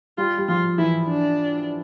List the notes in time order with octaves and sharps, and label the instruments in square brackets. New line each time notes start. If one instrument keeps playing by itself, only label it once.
[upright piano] G3 [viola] F4
[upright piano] G3
[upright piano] F3 [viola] F4
[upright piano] E3 [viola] E4
[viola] D4